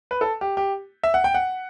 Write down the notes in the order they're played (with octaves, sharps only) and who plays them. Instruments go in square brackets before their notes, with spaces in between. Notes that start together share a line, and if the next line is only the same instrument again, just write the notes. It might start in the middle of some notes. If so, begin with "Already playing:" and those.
[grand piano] B4
A4
G4
G4
E5
F#5
G5
F#5